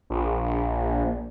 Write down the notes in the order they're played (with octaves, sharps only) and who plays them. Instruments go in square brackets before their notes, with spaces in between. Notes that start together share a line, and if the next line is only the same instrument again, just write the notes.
[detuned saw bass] A#1